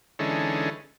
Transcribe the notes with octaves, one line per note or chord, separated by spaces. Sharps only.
D3 E3 G#3 C#4 D#4 A4